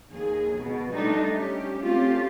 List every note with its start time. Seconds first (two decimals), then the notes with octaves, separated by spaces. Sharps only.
0.11 D#2 G#4
0.55 B2
0.91 G3 A3 D4 D#4 A4
1.33 C#4 G4
1.83 A3 C4 C#4 F4 G4